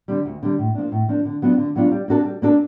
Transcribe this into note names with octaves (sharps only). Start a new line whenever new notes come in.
D3 G3
D2
D3 G3
A2
F3 A#3 D4
A2
F3 A#3 D4
D3
F#3 B3 D4 F4
D3
F#3 B3 D4 F4
G3
A#3 D4 F#4 A4
G3
A#3 D4 F#4 A4